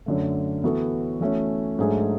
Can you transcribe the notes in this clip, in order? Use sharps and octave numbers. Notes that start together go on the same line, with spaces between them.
F#2 D3 A3
E3 B3 F#4 A4
E3 A3 C#4 F#4
G#2 F#3 A3 D4 G#4